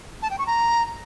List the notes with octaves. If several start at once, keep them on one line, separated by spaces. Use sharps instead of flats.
A5
G5
C#6
A#5